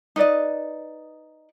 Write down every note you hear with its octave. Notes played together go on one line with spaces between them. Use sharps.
D#4 B4 D5 D#5